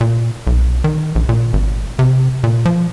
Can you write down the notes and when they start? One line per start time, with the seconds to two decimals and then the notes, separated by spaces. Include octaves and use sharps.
0.01 A#2
0.47 B1
0.84 D#3
1.15 A#1
1.29 A#2
1.53 G#1
1.99 C3
2.44 A#2
2.65 F3